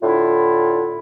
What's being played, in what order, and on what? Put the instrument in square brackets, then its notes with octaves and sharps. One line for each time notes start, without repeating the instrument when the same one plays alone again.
[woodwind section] A2 D3 E4 F4